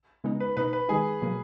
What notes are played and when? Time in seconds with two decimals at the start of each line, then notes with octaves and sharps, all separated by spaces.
0.24 C#3 G#3 B3 D#4
0.40 B4
0.57 B2 A#3 D#4 B4
0.73 B4
0.89 D#3 G#3 D#4 G#4
1.22 B2 F#3 A#3